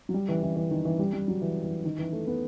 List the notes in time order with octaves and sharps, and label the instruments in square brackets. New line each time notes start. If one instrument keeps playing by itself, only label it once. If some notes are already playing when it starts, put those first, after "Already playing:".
[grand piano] F#3
G3
E3
E3
E3
D#3
E3
G3
G3
F#3
E3
E3
D#3
E3
A3
B3